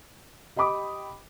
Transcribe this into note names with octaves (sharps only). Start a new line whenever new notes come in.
G4 D#5 G5 B5 D6 D#6